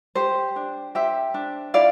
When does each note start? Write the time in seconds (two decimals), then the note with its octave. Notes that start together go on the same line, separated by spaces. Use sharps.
0.15 G4 C5
0.56 D4
0.95 G4 C5 E5
1.34 D4
1.74 E4 D5 F5